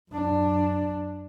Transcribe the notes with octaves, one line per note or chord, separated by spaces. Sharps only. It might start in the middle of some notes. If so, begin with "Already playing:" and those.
F#2 D4